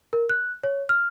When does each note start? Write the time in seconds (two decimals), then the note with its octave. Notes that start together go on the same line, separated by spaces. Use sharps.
0.13 A#4
0.29 F#6
0.63 C#5
0.89 F6